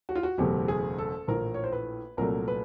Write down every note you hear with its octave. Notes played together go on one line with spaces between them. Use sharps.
F#4
F4
F#4
F#1 E2 B2 F#3 A3 G4
G#4
A4
A#1 A2 E3 A#4
C#5
C5
B4
C2 A#2 F#3 A3 A#4
B4